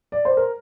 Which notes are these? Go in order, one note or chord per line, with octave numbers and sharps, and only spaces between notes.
D5
C5
A#4